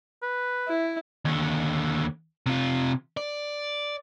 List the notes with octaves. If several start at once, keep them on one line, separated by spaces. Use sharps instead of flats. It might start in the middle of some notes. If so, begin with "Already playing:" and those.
B4
E4
D#2 D3
C3 F4
D5